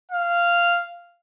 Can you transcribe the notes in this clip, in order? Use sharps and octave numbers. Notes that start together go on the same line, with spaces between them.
F5